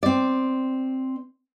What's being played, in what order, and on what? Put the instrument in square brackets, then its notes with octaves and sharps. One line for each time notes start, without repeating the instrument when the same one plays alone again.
[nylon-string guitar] C4 D5